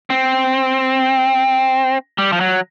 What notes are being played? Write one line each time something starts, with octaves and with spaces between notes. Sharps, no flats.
C4
G3
F3
F#3